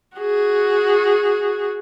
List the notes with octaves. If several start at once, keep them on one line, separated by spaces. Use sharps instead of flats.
F#4 G#4